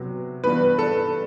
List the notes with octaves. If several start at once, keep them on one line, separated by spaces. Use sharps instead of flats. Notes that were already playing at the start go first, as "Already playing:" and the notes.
Already playing: C3 F#3 B3
G2 E3 B3 B4
A4